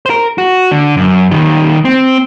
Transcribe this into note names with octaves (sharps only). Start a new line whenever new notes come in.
A#4 C5
F#4
D3
F#2
D#3 G3
C4